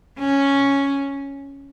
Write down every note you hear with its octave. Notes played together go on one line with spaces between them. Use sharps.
C#4